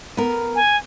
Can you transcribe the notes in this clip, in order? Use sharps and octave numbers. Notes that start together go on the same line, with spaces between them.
B3 A#4
G#5